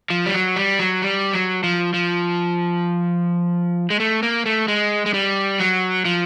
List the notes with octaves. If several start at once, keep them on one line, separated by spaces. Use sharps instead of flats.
F3
G3
F#3
G3
F#3
G3
F#3
F3
F3
G#3
A3
A#3
A3
G#3
G#3
G3
F#3
F3